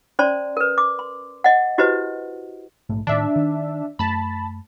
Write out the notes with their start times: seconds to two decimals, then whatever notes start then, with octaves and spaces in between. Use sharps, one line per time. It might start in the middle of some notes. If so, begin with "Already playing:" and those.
0.19 C#4 C5 D5 A5 C6
0.57 A#4 B4
0.78 D6
0.99 C6
1.44 D#5 F#5
1.78 E4 F#4 G4 B4 C5 D#5
2.89 A#1 G#2 A3
3.07 A2 D#3 D4 E5
3.36 D#3
3.99 F#2 A3 A5 B5